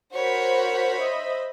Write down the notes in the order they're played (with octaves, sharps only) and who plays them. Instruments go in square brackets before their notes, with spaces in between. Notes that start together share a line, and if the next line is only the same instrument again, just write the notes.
[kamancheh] F#4 A#4 [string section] C5 B5 [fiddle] C#5
[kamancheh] D#5 E5